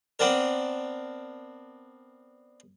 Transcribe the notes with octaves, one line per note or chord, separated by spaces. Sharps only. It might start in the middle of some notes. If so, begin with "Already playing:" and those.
B3 C4 D4 A#4